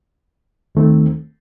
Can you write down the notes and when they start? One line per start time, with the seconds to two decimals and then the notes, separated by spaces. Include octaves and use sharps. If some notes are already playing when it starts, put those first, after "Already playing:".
0.75 D#2 D#3 A3 C4